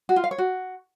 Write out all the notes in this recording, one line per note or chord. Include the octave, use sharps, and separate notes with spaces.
F#4
F4
F5
C#5
F#4